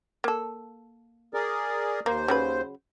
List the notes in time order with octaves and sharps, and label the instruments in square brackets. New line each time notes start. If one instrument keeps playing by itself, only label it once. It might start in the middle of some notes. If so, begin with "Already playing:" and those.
[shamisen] A#3 A4
[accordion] G#4 A#4 D5
[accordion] D#2 C5 [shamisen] A#3
[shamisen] C#3 F#3 B4